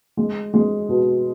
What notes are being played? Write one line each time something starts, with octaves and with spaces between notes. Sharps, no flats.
G#3
G#3
B2